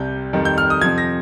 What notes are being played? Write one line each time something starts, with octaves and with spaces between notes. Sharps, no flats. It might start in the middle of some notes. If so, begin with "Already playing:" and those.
Already playing: C2 C3 G3 G6
F2 D#3 G3
G6
F6
D#6
F2 C3 F3 G#6
A#6